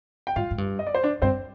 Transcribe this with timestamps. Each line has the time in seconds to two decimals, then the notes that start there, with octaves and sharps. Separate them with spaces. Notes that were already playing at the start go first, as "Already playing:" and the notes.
0.27 G5
0.36 G#2 F4 F5
0.51 G#2
0.58 G2
0.79 D#5
0.87 D5
0.95 C5
1.03 D4 D5
1.22 G2 C4 C5